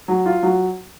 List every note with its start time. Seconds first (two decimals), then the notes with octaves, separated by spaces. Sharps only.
0.08 F#3
0.26 F4
0.43 F#3